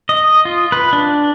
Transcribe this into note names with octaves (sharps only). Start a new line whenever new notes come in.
D#5
F4
B4
D4